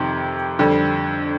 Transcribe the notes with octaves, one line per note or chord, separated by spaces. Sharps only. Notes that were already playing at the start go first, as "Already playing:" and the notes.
Already playing: F2 C3 D#3 C4
F2 D3 G3